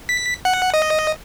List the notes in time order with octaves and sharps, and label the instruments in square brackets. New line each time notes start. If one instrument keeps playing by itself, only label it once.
[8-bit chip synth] B6
F#5
D#5